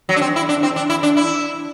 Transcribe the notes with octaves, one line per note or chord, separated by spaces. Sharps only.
F#3
D4
C4
E4
D4
C4
D4
E4
D4
E4